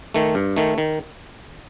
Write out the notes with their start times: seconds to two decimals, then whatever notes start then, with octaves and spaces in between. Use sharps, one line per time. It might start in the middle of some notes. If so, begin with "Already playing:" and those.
0.14 D#3 A3
0.35 G2
0.57 D#3 A3
0.78 D#3